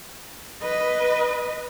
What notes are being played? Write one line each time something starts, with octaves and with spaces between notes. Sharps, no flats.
B4 D#5